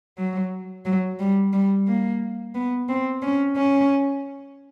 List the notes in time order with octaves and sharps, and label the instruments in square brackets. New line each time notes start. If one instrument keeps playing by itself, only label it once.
[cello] F#3
F#3
G3
G3
A#3
B3
C4
C#4
C#4